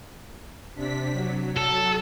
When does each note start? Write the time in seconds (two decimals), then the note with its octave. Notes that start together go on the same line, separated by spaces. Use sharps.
0.75 C3 D4 B6
1.12 F#3
1.57 A4